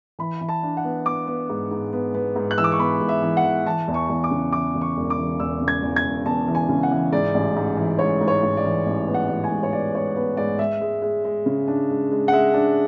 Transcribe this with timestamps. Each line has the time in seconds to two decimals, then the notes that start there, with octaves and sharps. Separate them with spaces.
0.19 E3 B5
0.41 E3
0.49 A5
0.63 D4
0.77 F#5
0.84 B3
1.06 B3 D6
1.27 B3
1.50 G#2
1.71 G#2
1.93 B3
2.15 B3
2.36 G#2
2.51 F#6
2.58 E3 E6
2.64 D6
2.72 C#6
2.79 B3 B5
3.01 G#2
3.09 E5
3.22 E3
3.37 F#5
3.44 E3
3.66 E3 A5
3.88 E2
3.94 C#6
4.09 E2
4.24 D6
4.31 C#3
4.52 E3 D6
4.75 E2
4.81 C#6
4.96 E1
5.10 D6
5.17 E3
5.40 E2 E6
5.61 C#3
5.68 G#6
5.82 E2
5.96 G#6
6.04 E1
6.26 E2 A5
6.48 E3
6.55 G#5
6.69 C#3
6.83 F#5
6.91 E3
7.12 G#2 D5
7.34 A1
7.56 G#2
7.77 E3
7.99 G#2 C#5
8.21 G#2
8.28 C#5
8.43 G#2
8.57 D5
8.65 E3
8.86 A1
9.08 B3
9.14 F#5
9.29 A1
9.44 G#5
9.51 G#2
9.63 C#5
9.73 B3 D5
9.95 B3 C#5
10.16 B3 B4
10.37 G#2 D5
10.59 G#3 E5
10.81 G#3
11.02 G#3
11.25 G#3
11.46 C#3
11.68 D4
11.90 G#3
12.11 G#3
12.28 F#5
12.32 G#3 E5
12.54 D4